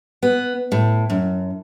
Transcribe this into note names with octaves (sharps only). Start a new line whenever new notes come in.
B3
A2
F#2